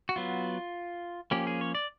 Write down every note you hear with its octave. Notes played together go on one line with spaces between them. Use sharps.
F#4
F#3 B3 F4
F3 A#3 C#4 G4
G#4
C#5
D5